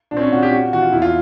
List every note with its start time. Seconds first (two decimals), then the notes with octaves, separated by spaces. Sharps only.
0.11 A#2 D4
0.17 C4
0.21 C#4
0.31 A#2 F#4
0.43 G4
0.52 G3 F#4
0.73 E3 F#4
0.82 F4
0.92 E2 E4
1.02 F4